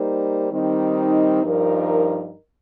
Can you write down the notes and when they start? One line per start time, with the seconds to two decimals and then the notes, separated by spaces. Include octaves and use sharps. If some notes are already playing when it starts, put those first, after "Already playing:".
Already playing: G3 A#3 D#4 C5
0.52 D#3 G3 C4 D#4
1.43 G2 F3 D#4 A#4